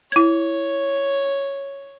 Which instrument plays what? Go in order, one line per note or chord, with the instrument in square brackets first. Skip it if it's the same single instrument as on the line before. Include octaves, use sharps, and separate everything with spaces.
[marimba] E4 G#6 [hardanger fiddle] C#5